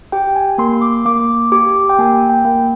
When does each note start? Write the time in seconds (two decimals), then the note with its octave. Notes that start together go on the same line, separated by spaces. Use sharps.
0.12 G4 G5
0.36 G#5
0.58 A#3 C6
0.82 D6
1.06 A#3 D6
1.52 G4 D6
1.89 G5
1.99 A#3 G#5
2.30 G5
2.45 A#3